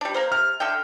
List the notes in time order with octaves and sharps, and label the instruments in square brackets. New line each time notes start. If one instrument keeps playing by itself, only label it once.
[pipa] G3 D4
A#3 A#4 C5
[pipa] C3 [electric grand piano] F6
[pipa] D3 E5 G5